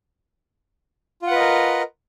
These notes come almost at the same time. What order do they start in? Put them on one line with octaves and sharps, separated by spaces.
F4 F#5 B4 D#5 A#4